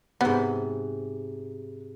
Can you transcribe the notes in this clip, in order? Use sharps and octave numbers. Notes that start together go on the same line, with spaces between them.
G#2 C3 B3